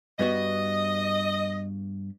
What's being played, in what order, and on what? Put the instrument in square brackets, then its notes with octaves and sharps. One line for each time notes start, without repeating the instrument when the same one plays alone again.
[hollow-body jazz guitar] G2 B3 F#4 [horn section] D#5